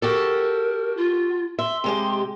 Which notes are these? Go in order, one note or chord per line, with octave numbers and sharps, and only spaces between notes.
F#4 G4 A4 A#4
F4
E5 C6
C3 G#3 G4